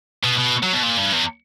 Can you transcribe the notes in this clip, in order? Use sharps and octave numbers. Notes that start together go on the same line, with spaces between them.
B2
B2
F#3
B2
A#2
G2
E2